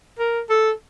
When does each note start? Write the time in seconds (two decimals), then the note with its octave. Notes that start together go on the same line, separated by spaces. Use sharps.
0.19 A#4
0.49 A4